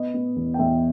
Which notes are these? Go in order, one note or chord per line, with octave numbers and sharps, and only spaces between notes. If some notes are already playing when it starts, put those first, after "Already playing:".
Already playing: B3 D#5
B3
E2
G5
E2 E5